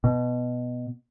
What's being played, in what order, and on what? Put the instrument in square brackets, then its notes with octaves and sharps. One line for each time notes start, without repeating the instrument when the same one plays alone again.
[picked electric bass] B2